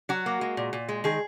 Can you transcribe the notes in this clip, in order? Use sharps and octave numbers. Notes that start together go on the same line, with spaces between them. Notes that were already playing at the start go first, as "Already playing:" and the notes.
F#3 F#4
A#3
G#3
A#2
A#2
G#3
D#3 G#4